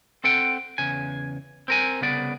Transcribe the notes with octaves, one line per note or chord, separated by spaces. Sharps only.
C4 A4 F#5 G5
E2 C#3 G#5
C4 A#4 G#5
C2 C#3 B3 D5